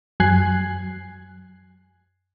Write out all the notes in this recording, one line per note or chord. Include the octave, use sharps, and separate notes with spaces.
F#2 F#3 G#5 F#6 G#6 C7